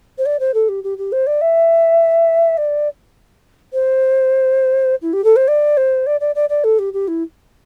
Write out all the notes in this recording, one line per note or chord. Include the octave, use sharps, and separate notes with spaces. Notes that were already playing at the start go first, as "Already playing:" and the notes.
C5
D5
C5
A4
G4
G4
G4
C5
D5
E5
D5
C5
E4
G4
A4
C5
D5
C5
D5
D5
D5
D5
A4
G4
G4
E4